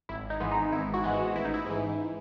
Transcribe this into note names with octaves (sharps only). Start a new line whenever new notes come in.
G#1 E4
D#4
G#2 E3 G#3 B3
D#4
G#1 E4
F#4
G#2 E3 G#3 B3
F#4
A1 E4
D#4
E4
G#2 E3